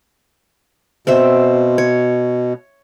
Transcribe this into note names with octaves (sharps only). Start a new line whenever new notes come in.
B2 C4 C5 E5
C#5